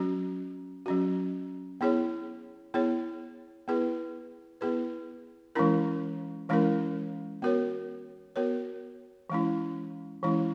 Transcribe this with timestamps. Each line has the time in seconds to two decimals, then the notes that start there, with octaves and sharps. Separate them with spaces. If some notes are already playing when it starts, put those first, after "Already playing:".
Already playing: F#3 C#4 F#4
0.86 F#3 C#4 F#4
1.81 B3 E4 G#4 C#5
2.74 B3 E4 G#4 C#5
3.68 B3 E4 G#4 B4
4.61 B3 E4 G#4 B4
5.55 E3 G#3 C#4 E4 A#4
6.49 E3 G#3 C#4 E4 A#4
7.42 B3 F#4 A#4 C#5
8.36 B3 F#4 A#4 C#5
9.30 E3 G#3 C#4 E4
10.23 E3 G#3 C#4 E4